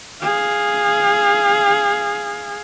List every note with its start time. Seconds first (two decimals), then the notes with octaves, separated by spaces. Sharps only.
0.22 G#4 F5